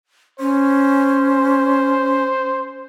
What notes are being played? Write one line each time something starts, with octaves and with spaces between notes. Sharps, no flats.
C#4 C5